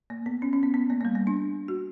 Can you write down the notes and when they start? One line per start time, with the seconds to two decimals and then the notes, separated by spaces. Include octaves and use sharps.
0.10 A#3
0.26 B3
0.42 C#4
0.53 C#4
0.63 B3
0.74 B3
0.90 A#3
1.01 A#3
1.05 G3
1.15 A#3
1.27 D4
1.68 F#4